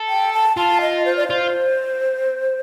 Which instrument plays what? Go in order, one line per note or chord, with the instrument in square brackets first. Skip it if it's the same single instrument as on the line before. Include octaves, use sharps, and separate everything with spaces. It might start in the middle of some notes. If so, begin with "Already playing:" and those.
Already playing: [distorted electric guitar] A4
[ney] G5
A5
[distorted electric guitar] F4 [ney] A5
[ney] D#5
C5
D5
[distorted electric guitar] F4 [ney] C5